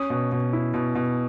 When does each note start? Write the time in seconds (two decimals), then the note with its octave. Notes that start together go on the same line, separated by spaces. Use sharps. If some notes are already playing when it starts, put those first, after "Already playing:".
Already playing: C#4 D#6
0.10 B2
0.32 B2
0.53 E4
0.74 B2
0.95 B2